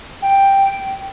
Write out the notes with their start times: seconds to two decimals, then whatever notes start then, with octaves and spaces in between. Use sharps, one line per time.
0.22 G5